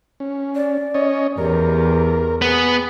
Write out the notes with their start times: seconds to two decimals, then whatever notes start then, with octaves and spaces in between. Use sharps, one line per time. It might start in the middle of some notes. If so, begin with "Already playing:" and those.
0.20 C#4
0.55 D5
0.94 C#4 C#5 D#5
1.38 E2 G4 A#4
2.42 B3 G#4